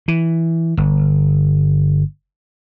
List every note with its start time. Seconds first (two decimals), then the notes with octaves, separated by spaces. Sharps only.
0.08 E3
0.77 G1